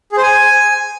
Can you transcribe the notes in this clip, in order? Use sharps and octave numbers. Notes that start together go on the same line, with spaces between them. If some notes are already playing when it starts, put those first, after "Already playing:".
G#4
C5
G#5